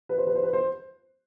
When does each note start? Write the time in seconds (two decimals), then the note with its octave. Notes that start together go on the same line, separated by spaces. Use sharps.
0.09 B4
0.18 C5
0.27 B4
0.35 C5
0.43 B4
0.53 C5